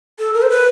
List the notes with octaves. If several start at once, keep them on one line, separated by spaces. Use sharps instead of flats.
A4
A#4
C5
B4